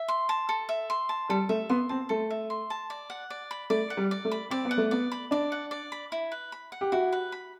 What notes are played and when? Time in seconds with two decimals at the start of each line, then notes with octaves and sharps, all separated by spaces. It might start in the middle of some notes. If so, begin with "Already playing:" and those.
Already playing: E5
0.08 C6
0.29 A5
0.49 A4
0.69 E5
0.90 C6
1.09 A5
1.29 G3 A4
1.49 A3 E5
1.69 B3 C6
1.89 C4 A5
2.09 A3 A4
2.30 E5
2.50 C6
2.70 A5
2.90 D5
3.10 F#5
3.30 D5
3.51 B5
3.70 A3 D5
3.90 F#5
3.97 G3
4.11 D5
4.25 A3
4.31 B5
4.50 C4 D5
4.65 B3
4.71 F#5
4.78 A3
4.91 B3 D5
5.12 B5
5.31 D4 D5
5.52 F#5
5.71 D5
5.92 B5
6.12 E4
6.32 B4
6.52 B5
6.72 F#5
6.81 G4
6.92 E4 F#4
7.12 B4
7.32 B5